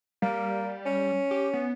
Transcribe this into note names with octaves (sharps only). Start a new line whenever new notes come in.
G3 A#3
C#4
G4
B3